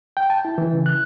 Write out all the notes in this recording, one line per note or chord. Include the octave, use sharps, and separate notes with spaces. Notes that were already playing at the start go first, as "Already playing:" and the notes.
G5
A5
E4
E3
C#3
F#6